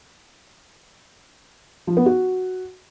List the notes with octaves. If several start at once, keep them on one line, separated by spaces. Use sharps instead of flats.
F3
B3
F#4